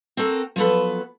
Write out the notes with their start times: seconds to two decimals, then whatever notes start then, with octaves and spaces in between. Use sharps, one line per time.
0.17 C4 F#4 A4 A#4
0.56 F3 F#3 B3 A4 B4